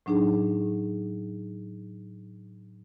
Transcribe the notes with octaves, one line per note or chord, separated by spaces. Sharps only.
A2 F#3 D4 D#4 G#4